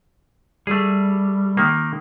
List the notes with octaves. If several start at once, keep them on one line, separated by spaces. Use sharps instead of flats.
G3 A3 G#4
D#3 A#3